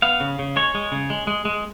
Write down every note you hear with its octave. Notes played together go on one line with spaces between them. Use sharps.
B3 F5
C#3
C#3
G#3 C#5
G#3
C#3
G#3
G#3
G#3